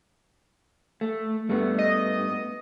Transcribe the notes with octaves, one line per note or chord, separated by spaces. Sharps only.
A3
G2 A3 B3
D#5